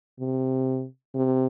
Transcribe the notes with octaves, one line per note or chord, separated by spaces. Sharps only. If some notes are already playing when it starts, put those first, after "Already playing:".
C3
C3